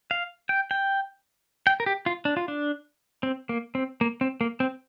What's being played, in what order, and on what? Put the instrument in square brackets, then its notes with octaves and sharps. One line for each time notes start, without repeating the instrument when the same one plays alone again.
[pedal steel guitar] F5
G5
G5
G5
A#4
G4
F4
D4
F4
D4
C4
A#3
C4
A#3
C4
A#3
C4